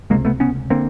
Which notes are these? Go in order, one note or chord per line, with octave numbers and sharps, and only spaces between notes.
C#2 C3 G#3 A#3
A3 B3
B3 C#4
D3 A#3 C4